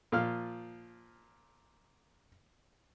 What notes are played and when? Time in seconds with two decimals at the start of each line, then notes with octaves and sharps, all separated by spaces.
0.12 A#2 F3 F5 F6